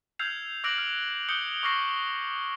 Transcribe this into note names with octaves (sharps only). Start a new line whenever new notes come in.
E6 F6 G6 G#6 C7 F7
D6 E6 F#6 A#6 D7 F#7
F6
D#6 G6 C#7 G7
C#6 D6 F6 A#6 C7 G7